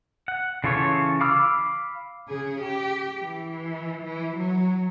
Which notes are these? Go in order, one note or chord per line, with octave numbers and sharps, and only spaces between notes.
F#5
C#3 E3 F4 A4 C#5
F5 B5 D6 E6 F6
C#3 G#4
G4
E3
E3
F#3